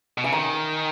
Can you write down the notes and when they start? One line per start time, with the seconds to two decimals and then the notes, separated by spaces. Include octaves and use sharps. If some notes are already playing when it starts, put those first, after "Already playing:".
0.18 B2
0.24 C#3 G#5
0.32 D#3 A#5